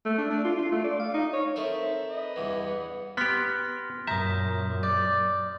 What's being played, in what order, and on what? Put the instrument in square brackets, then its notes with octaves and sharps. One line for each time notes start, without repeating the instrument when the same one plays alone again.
[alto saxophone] A3
D4
D4
F4
F4
A3
D5
F5
D#4
C#5
[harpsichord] C4 A4 A#4 [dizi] E5
[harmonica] B4 D#5
[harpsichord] E2 G2 E3 [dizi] F#5
[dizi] F#5
[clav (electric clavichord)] B3 G4 [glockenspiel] C6 F6 A#6
[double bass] F#2 A#2 [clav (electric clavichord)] E5 [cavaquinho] A#5 [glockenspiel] D#6 G6
[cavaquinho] D5 [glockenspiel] G6